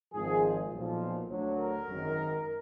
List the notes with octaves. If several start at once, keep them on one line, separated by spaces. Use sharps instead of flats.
G#1 G#2 F3 G#4
B1 A#2 F3
D2 D3 F#3
A#4
G#1 F#2 D#3